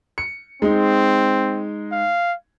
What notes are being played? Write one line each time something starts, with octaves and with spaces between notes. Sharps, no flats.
C#7
G#3 C4 D#4
F5